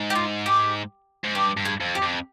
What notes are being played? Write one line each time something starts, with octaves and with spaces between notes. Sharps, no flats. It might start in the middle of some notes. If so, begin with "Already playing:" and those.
Already playing: G#2
G4
F4
G4
G#2
G2 G4
G2
G#4
F2
G4
F2